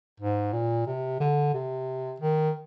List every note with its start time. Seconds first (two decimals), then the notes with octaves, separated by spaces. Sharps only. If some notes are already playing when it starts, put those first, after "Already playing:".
0.20 G#2
0.53 A#2
0.86 C3
1.20 D3
1.54 C3
2.20 D#3